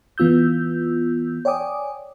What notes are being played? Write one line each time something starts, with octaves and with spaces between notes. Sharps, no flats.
E3 B3 F4 E6 G6
C#5 D5 G5 G#5 D6 D#6